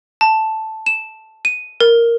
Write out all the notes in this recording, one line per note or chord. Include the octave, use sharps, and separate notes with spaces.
A5
E7
D#7
A#4